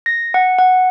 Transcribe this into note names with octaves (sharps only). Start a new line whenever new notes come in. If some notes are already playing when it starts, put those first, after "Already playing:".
A#6
F#5
F#5